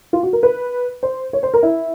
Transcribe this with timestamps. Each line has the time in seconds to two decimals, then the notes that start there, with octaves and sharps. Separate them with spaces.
0.13 F4
0.23 F#4
0.33 A#4
0.43 B4
1.03 C5
1.33 C#5
1.43 C5
1.54 A#4
1.63 E4